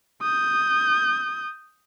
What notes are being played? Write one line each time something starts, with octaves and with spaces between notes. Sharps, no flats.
D#6 G6